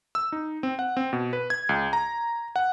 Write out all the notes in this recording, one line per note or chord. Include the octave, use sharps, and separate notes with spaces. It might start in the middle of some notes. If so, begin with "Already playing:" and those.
E6
D#4
C4
F#5
C4
B2
B4
G#6
C#2
A#5
F#5